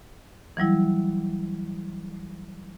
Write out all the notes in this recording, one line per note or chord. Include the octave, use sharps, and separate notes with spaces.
E3 F#3 G3 E4